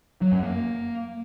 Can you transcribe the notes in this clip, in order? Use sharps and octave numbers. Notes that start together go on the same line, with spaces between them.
F#3
F#2
A#3